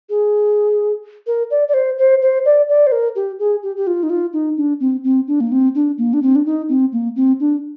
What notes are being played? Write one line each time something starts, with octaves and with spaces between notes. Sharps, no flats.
G#4
A#4
D5
D5
C5
C5
C5
D5
D5
C5
A#4
G4
G#4
G4
G4
F4
D#4
F4
D#4
D4
C4
C4
D4
A#3
C4
D4
A#3
D4
C4
D4
D#4
C4
A#3
C4
D4